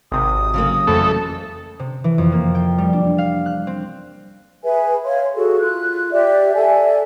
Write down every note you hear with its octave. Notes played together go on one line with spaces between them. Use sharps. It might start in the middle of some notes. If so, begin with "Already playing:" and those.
G#1 C3 D#6
C#3 F#3 A#3
F2 E3 A3 A4
C3
E3
F2
A#3
G5
G3
D4
F5
F#6
C4
G#4 B4 E5 G#5
C#5 F5 C6
F#4 G#4 A4
F4 F#6
G4 D5 E5
A4 D5 E5 G#5